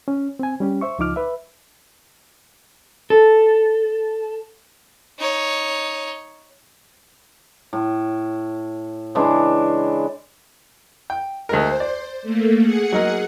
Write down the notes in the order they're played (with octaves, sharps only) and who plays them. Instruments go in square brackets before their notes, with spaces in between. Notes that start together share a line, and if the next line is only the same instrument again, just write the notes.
[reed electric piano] C#4
C4 G#5
G3 C#4 G4
C5 E5 C#6
C#2 F3 D#4 D6 F6
B4 E5
[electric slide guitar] A4
[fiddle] D#4 C#5
[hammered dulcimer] A2
C#3 E3 G#3 D4
[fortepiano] G5
[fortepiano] D2 G#3 A#4 [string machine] C5
[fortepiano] D5
[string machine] A3 A#3
G#4 F#5 C#7
[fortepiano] F#3 D#4 A#4